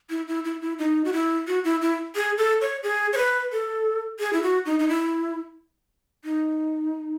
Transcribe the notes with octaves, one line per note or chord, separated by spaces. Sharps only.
E4
E4
E4
E4
D#4
F#4
E4
F#4
E4
E4
G#4
A4
C#5
G#4
C#5
B4
A4
G#4
E4
F#4
D#4
D#4
E4
D#4